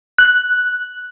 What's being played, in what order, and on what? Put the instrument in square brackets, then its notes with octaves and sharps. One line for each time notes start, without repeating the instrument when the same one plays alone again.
[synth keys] F#6